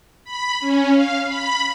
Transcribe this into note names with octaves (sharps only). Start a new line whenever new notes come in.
B5
C#4
F5
B5